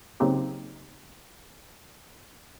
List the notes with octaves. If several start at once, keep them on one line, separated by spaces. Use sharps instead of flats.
C#3 F#3 A#3 C4 D#4 G4